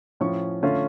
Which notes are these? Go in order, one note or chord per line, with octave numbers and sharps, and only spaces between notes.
A2 F3 C#4 C#6
D3 A3 C#4 F4